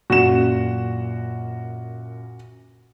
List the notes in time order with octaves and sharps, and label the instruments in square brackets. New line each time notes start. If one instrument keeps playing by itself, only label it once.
[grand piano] F#2 A#2 [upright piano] F#4 E7